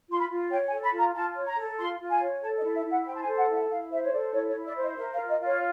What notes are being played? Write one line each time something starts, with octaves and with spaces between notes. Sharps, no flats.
F4 C6
B5
F4
C#5 G5
G#5
A4
B5
F4
A#5
F4 A5
C#5
A#5
A4
F4 C6
F4
G#5
C#5
A4 A5
D#5
E4
E5
E4
F#5
C5 G5
A5
G#5
A4
F#5
E4
F#5
E4 F5
C5 E5
C#5
A4 D5
E4 C#5
C#5
E4
D5
C5
D#5
A#4 E5
F5
F4
D#5
F4
C#5